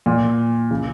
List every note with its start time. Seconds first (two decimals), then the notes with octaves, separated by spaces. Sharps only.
0.06 A#2
0.71 C#3